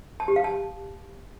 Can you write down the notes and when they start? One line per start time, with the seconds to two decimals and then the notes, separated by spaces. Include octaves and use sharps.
0.20 A5
0.28 G4
0.36 F5
0.44 A5